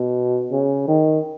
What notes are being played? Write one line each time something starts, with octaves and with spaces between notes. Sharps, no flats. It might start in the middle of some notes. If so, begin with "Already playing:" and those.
Already playing: B2
C#3
D#3